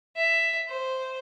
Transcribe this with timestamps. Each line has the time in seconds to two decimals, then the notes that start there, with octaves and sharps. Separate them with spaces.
0.16 E5
0.69 C5